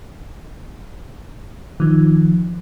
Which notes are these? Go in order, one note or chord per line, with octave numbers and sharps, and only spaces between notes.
D#3 F3